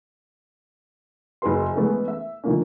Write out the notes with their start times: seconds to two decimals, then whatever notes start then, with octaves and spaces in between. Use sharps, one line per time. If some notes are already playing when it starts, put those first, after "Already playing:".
1.42 F#1 E4 F#4 G#4 B4 C6
1.76 E3 G#3 A3 B3 C#4 A4
2.08 E5
2.44 D3 D#3 F3 A3 A#3 C#4